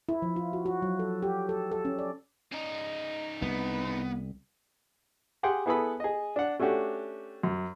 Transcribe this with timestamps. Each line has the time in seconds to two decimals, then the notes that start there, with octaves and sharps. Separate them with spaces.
0.09 E4
0.22 F3
0.36 F4
0.53 F#4
0.66 F#4
0.82 F#3
0.99 A4
1.23 G4
1.49 A4
1.72 A4
1.85 C#4
1.99 D5
2.52 C#3 D#4
3.42 C2 B3
5.43 G4 G#4 F#5 G5 C6
5.66 B3 E4 G#4 A4 B4 B5
6.00 G#4 D#5
6.36 D4 F#5
6.60 A3 C#4 D4 F#4 G4
7.43 F#2